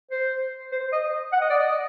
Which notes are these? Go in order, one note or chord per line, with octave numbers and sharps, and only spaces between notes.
C5
C5
D#5
F#5
D#5
D5
D#5